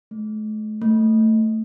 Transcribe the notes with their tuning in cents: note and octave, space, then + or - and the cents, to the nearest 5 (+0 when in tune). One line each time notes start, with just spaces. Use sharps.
A3 -40
A3 +10